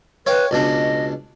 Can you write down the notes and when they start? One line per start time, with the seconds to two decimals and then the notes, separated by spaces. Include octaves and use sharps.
0.27 B4 C#5 F5 G5
0.51 C#2 B2 D4 D#5